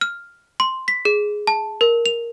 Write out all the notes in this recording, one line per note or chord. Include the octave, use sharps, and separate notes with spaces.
F6
C6
B6
G#4
A5
A#4
F7